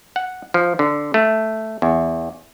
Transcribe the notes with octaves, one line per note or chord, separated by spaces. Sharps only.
F#5
F3
D3
A3
E2